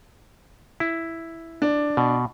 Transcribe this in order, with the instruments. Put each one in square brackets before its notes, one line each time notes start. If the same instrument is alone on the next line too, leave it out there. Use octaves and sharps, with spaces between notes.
[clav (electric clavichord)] E4
[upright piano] D4
[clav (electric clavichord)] B2